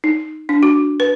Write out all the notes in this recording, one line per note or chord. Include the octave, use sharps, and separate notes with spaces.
D#4
D4
F#4
B4